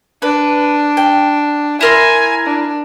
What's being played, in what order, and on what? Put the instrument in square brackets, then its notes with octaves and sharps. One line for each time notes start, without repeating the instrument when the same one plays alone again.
[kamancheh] D4 [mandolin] B4
[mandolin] G5
[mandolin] E4 A#4 C6 [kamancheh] G#5
[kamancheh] D4